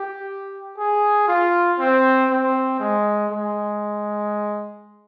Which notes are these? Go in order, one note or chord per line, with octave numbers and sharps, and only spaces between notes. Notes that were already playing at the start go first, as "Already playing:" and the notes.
Already playing: G4
G#4
F4
C4
C4
G#3
G#3